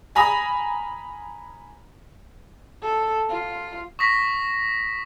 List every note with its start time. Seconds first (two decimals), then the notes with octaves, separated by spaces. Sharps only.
0.15 G#5 A#5 B5 D#6 A#6
2.82 A4
3.29 F4
3.99 C#6 D#6 A#6 B6